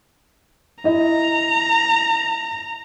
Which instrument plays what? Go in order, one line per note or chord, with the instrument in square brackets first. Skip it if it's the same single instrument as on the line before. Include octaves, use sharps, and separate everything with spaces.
[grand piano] E4 D#5 [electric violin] A#5